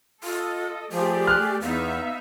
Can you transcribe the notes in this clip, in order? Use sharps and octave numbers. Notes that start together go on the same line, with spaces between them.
F4 A4 D#5
F3 A3 G4 G#4 D5
F6 F#6
E2 B3 D#4 E5 F5